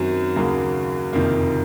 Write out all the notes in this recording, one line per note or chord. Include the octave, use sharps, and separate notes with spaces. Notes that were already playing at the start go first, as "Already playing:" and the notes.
Already playing: F#2 D#3 F#3 C4
D#2 C#3 F#3 A#3
F#1 F2 C3 D#3 A#3